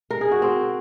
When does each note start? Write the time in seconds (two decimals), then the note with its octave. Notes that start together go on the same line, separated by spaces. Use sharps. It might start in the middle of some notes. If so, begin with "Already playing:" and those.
0.11 A#4
0.21 G#4
0.32 F#4
0.42 C4